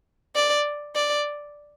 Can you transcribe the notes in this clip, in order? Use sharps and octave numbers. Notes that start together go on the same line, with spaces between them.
D5
D5